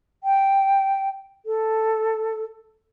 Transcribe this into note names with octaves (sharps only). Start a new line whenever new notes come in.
G5
A4